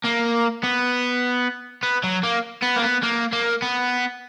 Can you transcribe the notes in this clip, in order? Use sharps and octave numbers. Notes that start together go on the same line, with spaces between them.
A#3
B3
B3
F#3
A#3
B3
A#3
B3
A#3
A#3
B3